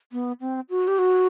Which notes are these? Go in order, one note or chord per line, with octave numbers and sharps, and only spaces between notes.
B3
C4
F#4
G4
F#4